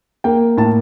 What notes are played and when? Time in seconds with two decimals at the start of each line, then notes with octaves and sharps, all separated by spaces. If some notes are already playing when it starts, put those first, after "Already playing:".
0.24 A#3 G5
0.57 A2 A5